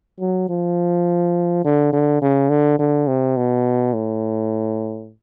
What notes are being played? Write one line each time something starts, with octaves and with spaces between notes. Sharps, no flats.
F#3
F3
D3
D3
C#3
D3
D3
C3
B2
A2